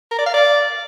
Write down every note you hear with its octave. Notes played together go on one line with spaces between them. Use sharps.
A#4
D5
F5
D5